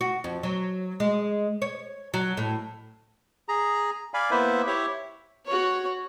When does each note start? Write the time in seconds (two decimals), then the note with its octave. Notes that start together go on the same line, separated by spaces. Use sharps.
0.01 F#4
0.24 F2
0.43 F#3
1.00 G#3
1.62 C#5
2.14 F#3
2.37 A2
3.49 G#4 A#5
4.14 D5 F5 G#5 B5
4.31 A#3 B3 E4 B4 C5 E5
4.67 E4 G4 C#5 E5
5.46 F#4 C#5